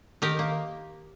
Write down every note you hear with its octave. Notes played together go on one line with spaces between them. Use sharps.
D#3 G4 A#4
A#3